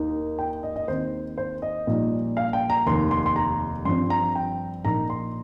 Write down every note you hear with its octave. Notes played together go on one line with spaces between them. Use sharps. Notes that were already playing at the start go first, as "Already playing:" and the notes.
Already playing: D#2 D#3 A#3 D#4
G5
D#5
D#5
D#2 D#3 C4 D#4 C5
C5
D#5
A#1 A#2 G3 A#3 D#4
F5
G5
A#5
F1 D#2 D#3 C6
C6
C6
A#5
G2 F3 C4 C6
A#5
G5
A#1 A#2 A#3 D#4 A#5
C6